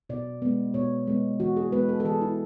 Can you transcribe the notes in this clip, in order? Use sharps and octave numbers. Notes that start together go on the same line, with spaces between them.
B2 D5
G#3 B3
B2 C#5
G#3 B3
E3 F#4
G#4
G#3 B3 B4
A4
A4
E3 G#4
E4